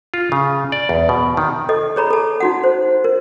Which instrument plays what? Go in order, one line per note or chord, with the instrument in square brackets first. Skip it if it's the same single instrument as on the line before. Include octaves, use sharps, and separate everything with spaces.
[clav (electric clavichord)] F4
C#3
D5
E2
B2
D#3
[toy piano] A4 D#5
G#4 C#5 A#5 B5
A4 A5
D#4 F#4 F#5
C5
A#4